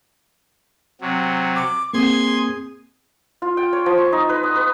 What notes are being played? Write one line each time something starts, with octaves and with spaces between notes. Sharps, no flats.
C3 F#3
D6
A#3 C4 G#4 C6 G#6
F4
G5
C#5
F3
C#6
D#4
B4
D#6
B4